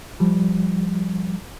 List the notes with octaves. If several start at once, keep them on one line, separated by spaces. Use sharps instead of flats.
F3 G3